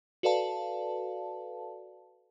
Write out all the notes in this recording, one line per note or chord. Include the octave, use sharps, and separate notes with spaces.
F#4 A4 B4 D5 F5 A5